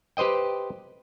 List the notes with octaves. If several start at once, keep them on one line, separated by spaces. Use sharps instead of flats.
G4 B4 C5 D#5 G5